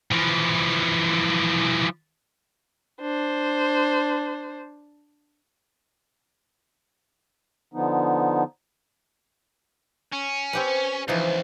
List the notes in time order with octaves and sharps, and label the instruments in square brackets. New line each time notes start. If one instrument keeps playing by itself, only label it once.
[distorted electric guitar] E3 F3
[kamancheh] D4 C5
[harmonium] D3 F3 B3 D#4
[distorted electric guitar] C#4
[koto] C4 G4 B4
[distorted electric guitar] C#2 [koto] E3 F3 D#4